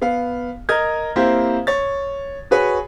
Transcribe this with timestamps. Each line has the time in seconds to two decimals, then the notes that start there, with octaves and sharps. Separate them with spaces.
0.02 B3 F5
0.69 A#4 D#5 F6 G#6
1.16 A#3 C4 E4 G4 C5
1.67 C#5 A6
2.51 F#4 G#4 B4 C#5